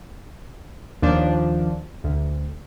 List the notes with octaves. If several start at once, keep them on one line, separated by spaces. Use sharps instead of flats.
D#2 F3 D4
D2